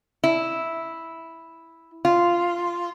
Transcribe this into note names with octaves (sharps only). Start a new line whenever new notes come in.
E4
F4